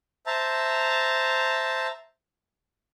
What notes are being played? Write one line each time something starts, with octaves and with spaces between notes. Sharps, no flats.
C5 E5 A5 A#5